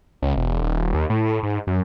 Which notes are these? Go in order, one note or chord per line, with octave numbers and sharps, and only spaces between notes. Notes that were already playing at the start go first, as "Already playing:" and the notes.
C#2
E1
D#1
D#2
A2
G#2
F#2